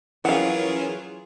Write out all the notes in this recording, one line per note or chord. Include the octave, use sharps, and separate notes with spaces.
E3 F#3 C#4 F4 G#4 A#4 F5 F#5